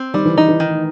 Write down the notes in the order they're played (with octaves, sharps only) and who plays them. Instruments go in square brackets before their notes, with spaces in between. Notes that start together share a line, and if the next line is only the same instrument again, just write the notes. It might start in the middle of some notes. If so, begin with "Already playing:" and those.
Already playing: [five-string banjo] C4
[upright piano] D#3 [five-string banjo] G3
[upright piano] E3
[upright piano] D#3 [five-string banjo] D#4
[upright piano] E3
[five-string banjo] D#3